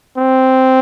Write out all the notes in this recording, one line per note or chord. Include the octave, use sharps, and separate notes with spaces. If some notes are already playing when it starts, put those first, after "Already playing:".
C4